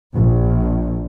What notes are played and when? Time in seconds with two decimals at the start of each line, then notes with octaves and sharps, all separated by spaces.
0.15 A#1